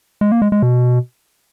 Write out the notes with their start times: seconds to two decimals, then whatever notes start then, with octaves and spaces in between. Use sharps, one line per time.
0.21 G#3
0.32 A#3
0.42 G#3
0.52 G#3
0.62 B2